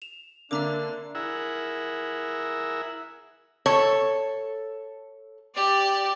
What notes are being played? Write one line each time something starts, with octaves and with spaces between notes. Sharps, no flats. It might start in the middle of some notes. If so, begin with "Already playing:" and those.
E7 F7
D3 A#3 D4 E5 A#5 D6
E4 G#4 A#4 E5 F#5
A4 C#5
G4 D5